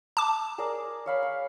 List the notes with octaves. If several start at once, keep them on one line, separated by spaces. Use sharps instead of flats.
A5 D6
G#4 A#4 D5
C#5 F5 B5
F5